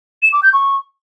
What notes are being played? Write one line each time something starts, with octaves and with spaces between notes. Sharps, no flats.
E7
D6
G6
C#6